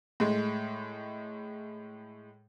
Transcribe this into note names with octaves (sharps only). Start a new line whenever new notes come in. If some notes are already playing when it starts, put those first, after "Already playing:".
A2 G#3